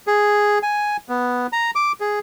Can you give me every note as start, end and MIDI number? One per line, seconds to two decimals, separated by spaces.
0.07 0.59 68
0.63 0.97 80
1.09 1.47 59
1.53 1.71 82
1.75 1.92 86
2.00 2.19 68